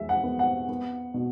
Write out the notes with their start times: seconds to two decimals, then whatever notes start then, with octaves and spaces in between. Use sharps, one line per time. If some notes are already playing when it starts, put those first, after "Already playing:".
Already playing: E2 G#3 E5
0.09 F#5
0.23 B3
0.39 F#5
0.69 B3
1.14 B2